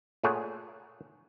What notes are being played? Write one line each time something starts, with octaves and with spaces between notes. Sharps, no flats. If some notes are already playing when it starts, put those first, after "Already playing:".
A#2 A3 G#4 C#5 F#5